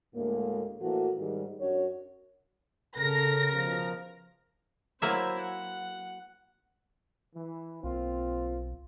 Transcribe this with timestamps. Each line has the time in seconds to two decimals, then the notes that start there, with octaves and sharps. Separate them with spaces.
0.15 D2 A2 G#3 A#3
0.81 A2 E3 A#3 F#4 A4
1.18 G#2 D#3 G3
1.60 F#2 D4 F#4 C#5
2.96 C#3 A4 A#4 A#6
3.52 B2 F3
5.02 F#3 A#3 E4 C5 E5
5.41 F#5
7.35 E3
7.84 B1 A#3 C4 F4